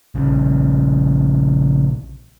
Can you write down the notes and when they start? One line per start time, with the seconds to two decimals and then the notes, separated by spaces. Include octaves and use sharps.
0.15 A#1 C#3